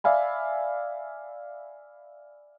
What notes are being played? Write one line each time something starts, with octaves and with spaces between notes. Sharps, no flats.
D5 E5 F5 G#5 B5